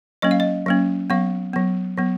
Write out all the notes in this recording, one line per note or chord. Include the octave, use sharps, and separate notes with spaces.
F#3 A#3 C#4 D#5
F5
D#5
F#3 A#3 C#4
F#3 B3 F5
F#3 B3
F#3 B3